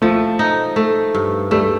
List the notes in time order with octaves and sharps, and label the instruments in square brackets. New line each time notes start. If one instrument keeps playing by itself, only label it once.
[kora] F3 [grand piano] A3
[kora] D#4
A3
G2
[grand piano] G3 [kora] A3